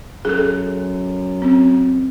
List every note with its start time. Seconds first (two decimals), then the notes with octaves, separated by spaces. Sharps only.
0.25 F#2 G#4 A4
1.42 C4